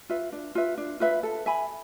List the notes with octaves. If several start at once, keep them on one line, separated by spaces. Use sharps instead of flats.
F4 B4 E5
D4
F4 B4 E5
D4
F4 B4 E5
A4
E5 G#5 B5